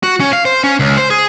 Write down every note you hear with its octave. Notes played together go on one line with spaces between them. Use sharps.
F#4
C#4
F5
C5
C#4
C#2
C5
G#4